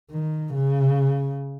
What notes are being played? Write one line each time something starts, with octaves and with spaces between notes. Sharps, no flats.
D#3
C#3